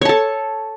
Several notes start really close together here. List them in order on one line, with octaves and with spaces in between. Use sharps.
C#5 A5 A4